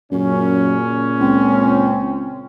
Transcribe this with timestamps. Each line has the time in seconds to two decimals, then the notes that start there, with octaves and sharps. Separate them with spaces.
0.11 F#2 A#2 C#3 C#4
1.20 C#2 C4